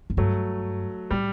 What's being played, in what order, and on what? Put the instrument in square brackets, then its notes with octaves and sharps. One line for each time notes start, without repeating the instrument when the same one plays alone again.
[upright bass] F#2
[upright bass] G2 [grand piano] F#3 A3
[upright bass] A2 [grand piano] G3